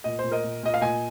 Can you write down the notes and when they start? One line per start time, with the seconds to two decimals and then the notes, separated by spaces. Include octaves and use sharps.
0.04 A#2 D#5
0.19 C5
0.24 A#2
0.32 A#4 D#5
0.44 A#2
0.63 A#2 D#5
0.74 F5
0.81 A#2 D#5 G#5